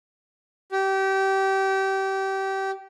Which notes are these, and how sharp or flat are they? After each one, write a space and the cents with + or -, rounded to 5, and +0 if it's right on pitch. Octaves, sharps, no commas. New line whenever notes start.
G4 -25